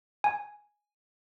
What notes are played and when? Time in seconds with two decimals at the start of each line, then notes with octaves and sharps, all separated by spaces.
0.24 G#5